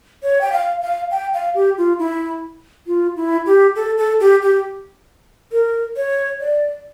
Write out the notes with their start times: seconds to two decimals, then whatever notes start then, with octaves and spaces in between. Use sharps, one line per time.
0.23 C#5
0.41 G5
0.52 F5
0.81 F5
1.11 G5
1.34 F5
1.55 G4
1.78 F4
1.99 E4
2.87 F4
3.16 E4
3.46 G4
3.76 A4
3.98 A4
4.20 G4
4.42 G4
5.52 A#4
5.96 C#5
6.41 D5